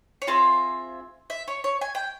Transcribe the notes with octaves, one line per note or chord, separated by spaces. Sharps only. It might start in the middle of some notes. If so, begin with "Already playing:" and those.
C#5
C4 F4 G#4 E5
E5
C#5
C#5
G#5
G5